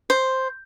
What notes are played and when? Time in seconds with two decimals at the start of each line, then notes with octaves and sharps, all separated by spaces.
0.10 C5